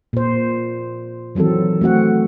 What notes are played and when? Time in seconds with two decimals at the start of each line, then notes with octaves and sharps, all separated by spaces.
0.13 A#2 C5
1.35 D#3 E3 F#3 C4 A4
1.81 A3 C4 F#4 F#5